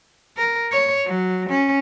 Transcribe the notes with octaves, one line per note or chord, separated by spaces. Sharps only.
A#4
C#5
F#3
C#4